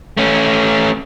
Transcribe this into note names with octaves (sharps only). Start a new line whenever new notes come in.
A3 C#4